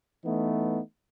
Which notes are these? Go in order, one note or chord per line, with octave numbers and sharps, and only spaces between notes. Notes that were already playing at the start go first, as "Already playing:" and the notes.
E3 A3 B3 D#4